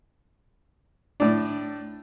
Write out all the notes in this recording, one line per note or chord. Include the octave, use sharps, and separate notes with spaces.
A2 D4